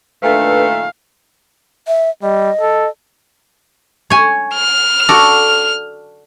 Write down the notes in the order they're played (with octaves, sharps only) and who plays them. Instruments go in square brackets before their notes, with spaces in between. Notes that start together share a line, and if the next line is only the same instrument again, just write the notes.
[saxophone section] A#2 D#3 A3 [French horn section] D4 A4 B4 [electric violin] F5
[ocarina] E5
[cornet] G3 [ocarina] D#5
[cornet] A4
[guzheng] C#5 G#5
[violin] F6
[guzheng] F#4 A4 D5